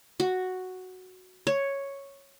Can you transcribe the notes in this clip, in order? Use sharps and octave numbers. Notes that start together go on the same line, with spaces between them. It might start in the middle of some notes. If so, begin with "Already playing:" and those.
F#4
C#5